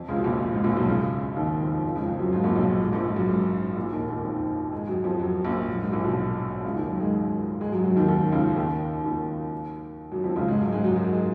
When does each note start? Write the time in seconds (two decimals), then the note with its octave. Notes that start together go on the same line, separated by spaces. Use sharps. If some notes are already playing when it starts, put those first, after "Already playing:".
Already playing: F2 F3
0.08 C#2 C#3
0.18 B2
0.24 A#1 A#2
0.52 G#2
0.64 A#1 A#2
0.76 B1 B2
0.88 C#2 C#3
1.36 D#2 D#3
1.60 F2 F3
1.84 F2 F3
1.96 C#2 C#3
2.08 F2 F3
2.20 F#2 F#3
2.33 G#2
2.44 A#1 A#2
2.56 B1 B2
2.68 G#2
2.80 G#2
2.92 A#1 A#2
3.04 G#2
3.16 F#2
3.28 G#2
3.76 A#1 A#2
3.92 D#2 D#3
4.08 D#2 D#3
4.24 F2 F3
4.72 G#2 G#3
4.88 F#2 F#3
5.04 F2 F3
5.20 F#2 F#3
5.44 A#1 A#2
5.68 F#2
5.80 G#2
5.92 A#1 A#2
6.04 B1 B2
6.64 C#2 C#3
6.76 D#2 D#3
6.89 F#2 F#3
7.00 G#2 G#3
7.61 G#2 G#3
7.72 F#2 F#3
7.84 F#2 F#3
7.96 D#2 D#3
8.08 D#2 D#3
8.32 C#2 C#3
8.56 D#2 D#3
9.04 D#2 D#3
10.12 F#2 F#3
10.24 F2 F3
10.36 C#2 C#3
10.48 G#2 G#3
10.61 F#2 F#3
10.72 G#2 G#3
10.84 F#2 F#3
10.96 F#2 F#3
11.12 G#3